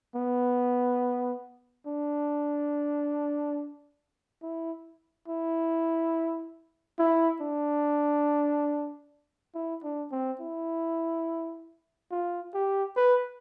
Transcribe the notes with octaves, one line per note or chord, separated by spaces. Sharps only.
B3
D4
E4
E4
E4
D4
E4
D4
C4
E4
F4
G4
B4